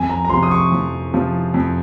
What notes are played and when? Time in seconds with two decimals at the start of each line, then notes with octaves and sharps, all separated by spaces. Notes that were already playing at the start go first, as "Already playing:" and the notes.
Already playing: F2 G#5
0.09 A#5
0.25 A#5
0.29 C3 F3 C6
0.43 D#6
0.51 C#6
0.72 F2
1.13 C3 F3
1.54 F2